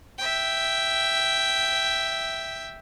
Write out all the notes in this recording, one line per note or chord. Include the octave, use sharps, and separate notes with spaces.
E5 G5